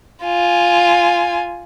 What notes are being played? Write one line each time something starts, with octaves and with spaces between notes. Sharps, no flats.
F4 G#5